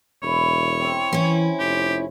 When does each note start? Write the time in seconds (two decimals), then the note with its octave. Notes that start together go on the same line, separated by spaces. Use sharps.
0.23 E1 E4 C#5
0.81 C4
1.13 E3 C#4 E4
1.59 F1 G4